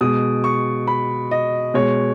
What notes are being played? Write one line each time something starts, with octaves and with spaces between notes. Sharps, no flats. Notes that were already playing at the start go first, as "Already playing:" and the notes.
B2 G#3 D#6
C#6
B5
D#5
B2 G#3 C#5